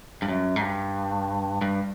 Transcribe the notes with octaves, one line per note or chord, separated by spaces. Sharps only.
G2
F#2
G#2
G2
G2